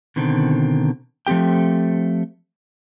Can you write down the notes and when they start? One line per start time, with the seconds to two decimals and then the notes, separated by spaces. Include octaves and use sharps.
0.16 B2 D3 D#3 C4
1.27 F3 A3 C4 G4 G5